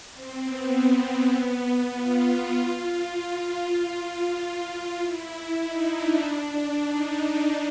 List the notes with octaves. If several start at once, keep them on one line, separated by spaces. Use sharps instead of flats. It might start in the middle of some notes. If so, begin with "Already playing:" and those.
C4
B3
B3
F4
F4
E4
D#4
D4
D4
D#4